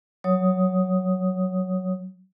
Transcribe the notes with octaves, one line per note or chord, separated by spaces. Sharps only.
F#3 C#5 D#6